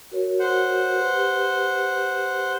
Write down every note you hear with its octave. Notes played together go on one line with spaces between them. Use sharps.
F#4 A#4 C#5
C5 F#5
G4 B4